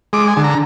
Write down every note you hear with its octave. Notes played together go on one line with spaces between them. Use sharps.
G#3 D6
G#5
D3
A#5